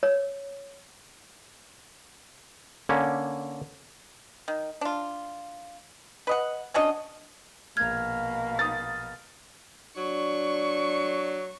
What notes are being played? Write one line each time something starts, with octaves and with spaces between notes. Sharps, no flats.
C#5
D3 A#3 C#4
D#3
D4 F4
B4 D#5 F#5
C#4 D4 F#4 D#5
A#1 B2 A#3 F6 G#6
D#6 A6
F#3 D4 C#6